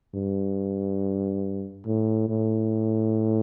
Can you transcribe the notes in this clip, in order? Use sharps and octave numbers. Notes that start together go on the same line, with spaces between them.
G2
A2
A2